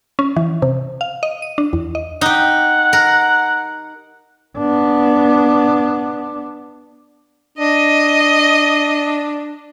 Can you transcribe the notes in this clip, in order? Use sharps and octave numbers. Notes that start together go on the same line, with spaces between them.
C#4
E3
C3
F5
D#5
D#7
D4
E2
D#5
D#4 G4 F#5
A#4
B3 D4
D4 D#5